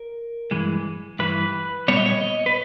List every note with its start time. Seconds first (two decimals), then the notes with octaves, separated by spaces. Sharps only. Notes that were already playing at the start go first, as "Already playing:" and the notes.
Already playing: A#4
0.51 G2 E3 G#3
1.19 G2 E3 B4
1.88 A#2 G3 B3 C#5
1.97 D#5
2.06 C#5
2.22 D#5
2.46 B4